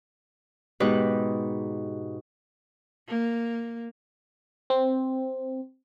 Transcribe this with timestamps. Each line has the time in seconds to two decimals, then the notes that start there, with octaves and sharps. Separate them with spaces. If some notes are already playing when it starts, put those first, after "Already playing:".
0.80 G#2 B2 D#4 G4 B4 F#6
3.08 A#3
4.70 C4